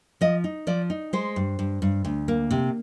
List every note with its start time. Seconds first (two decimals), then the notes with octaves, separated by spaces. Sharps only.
0.21 F3 D#5
0.44 D#4
0.67 F3 D5
0.90 D#4
1.13 G#3 C5
1.36 G2
1.59 G2
1.82 G2
2.05 D2
2.28 A#3
2.51 C3